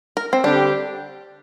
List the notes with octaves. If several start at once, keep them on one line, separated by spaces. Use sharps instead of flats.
A#4
C4
D3 G3 C4 D4 G4